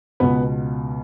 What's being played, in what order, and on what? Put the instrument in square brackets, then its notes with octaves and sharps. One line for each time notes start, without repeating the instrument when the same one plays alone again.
[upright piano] C#2 B2 B3 B4